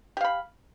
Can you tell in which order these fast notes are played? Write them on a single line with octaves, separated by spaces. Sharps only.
G4 F5 B5